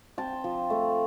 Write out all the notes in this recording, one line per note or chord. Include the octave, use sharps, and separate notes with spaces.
C4 G5 A5
F3
A3